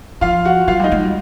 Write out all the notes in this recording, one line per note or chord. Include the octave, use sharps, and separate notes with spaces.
F3 F4 F5
F#4 F#5
F#3 F4 F5
G3 D#4 D#5
G#3
G3